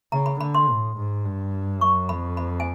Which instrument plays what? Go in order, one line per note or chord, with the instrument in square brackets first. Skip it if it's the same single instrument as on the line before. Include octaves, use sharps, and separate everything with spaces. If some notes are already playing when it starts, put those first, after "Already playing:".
[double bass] C#3 [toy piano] A#5
[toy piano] B5
[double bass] D3 [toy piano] B5
[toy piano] C6
[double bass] A2
G#2
G2
[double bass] F#2 [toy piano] C#6
[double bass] F2 [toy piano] B5
[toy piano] B5
G#5